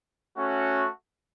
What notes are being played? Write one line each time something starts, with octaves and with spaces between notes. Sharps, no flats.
A3 C#4 F#4